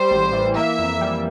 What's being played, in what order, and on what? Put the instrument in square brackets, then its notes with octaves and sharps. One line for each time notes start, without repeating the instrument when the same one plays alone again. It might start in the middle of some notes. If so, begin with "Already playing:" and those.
Already playing: [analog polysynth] G3 [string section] C5
[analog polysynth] A1
E3
[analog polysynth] A#3 [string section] E5
[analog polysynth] F2
G3